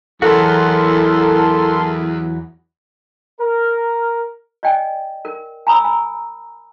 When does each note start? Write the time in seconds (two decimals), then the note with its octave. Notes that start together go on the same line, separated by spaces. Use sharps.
0.22 E2 E3 F#3 F#4 A4 A#4 C6
3.41 A#4
4.63 D5 D#5 G5 G#5
5.25 A#4
5.67 G#5 A#5 B5 D#6 E6
5.84 G#5